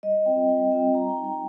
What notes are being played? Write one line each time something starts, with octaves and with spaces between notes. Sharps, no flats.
G3 D#5
C4 F4 G5
G3 G5
C4 F4 G5
G3 A#5
G5
D#4
G5